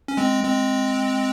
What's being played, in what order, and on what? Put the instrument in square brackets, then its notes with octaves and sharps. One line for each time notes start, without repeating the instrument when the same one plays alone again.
[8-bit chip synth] C#4
G#3 C4
G#3 C4